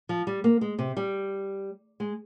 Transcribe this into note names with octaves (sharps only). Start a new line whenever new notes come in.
F3
G3
A#3
G#3
C3
G3
G#3